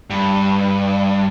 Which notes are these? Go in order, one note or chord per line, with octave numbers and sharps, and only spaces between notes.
G2